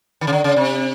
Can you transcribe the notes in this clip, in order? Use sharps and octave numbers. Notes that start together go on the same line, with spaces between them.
D#3
C#3
D3
C#3
C3